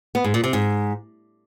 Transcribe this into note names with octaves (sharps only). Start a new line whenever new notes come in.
B3
G#2
A#2
C3
G#2